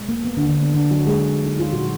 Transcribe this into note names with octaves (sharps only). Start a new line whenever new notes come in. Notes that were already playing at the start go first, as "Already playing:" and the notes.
Already playing: B2 G#3
A#3
B3
D3 D4
D3 D4
B3
D3 D4
F#3 F#4
G#3 G#4
D#4
F4
A#2 F#3 G#3 F#4